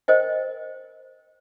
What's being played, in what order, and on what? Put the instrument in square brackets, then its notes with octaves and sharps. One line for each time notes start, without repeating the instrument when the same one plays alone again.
[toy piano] A#4 C5 D#5 G5